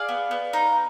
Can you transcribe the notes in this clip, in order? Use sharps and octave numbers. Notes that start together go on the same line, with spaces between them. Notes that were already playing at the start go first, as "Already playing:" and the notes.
Already playing: G#4 D5 F5
B3
B3
D#4